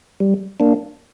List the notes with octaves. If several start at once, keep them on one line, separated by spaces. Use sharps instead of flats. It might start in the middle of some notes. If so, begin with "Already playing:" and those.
G3
A#3 D4